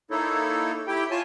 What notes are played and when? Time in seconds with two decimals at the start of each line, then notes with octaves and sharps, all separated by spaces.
0.11 A#3 D#4 E4 A4 C#5
0.88 E4 G4 G5
1.11 F4 C#5 G#5 A5